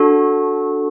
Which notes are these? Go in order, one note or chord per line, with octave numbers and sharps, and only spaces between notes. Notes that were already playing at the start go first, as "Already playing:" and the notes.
Already playing: D4 F#4 A4